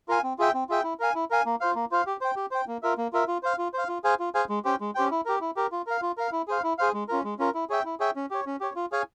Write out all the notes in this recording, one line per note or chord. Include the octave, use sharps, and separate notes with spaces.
F4 A#4 F5 G#5
C4
F4 G#4 E5 G5
C4
F4 G#4 E5 G5
E4
A#4 F5 G#5
E4
A#4 F5 G#5
A#3
F4 C5 F5
A#3
F4 C5 F5
G4
C5 G5
G4
C5 G5
A#3
F4 A#4 E5
A#3
F4 A#4 E5
F4
C5 F5
F4
C5 F5
F4
G#4 C5 F5 G#5
F4
G#4 C5 F5 G#5
G#3
C#4 G4 C5 G5
G#3
C#4 G4 C5 G5
E4
G4 A#4
E4
G4 A#4
F4
A#4 F5
F4
A#4 F5
E4
G#4 C5 F5
E4
G#4 C5 F5
G#3
C#4 F4 A#4
G#3
C#4 F4 A#4
E4
G#4 C#5 E5 G5
E4
G#4 C#5 E5 G5
C#4
G4 C#5
C#4
G4 C#5
F4
G#4 C#5 F5 G#5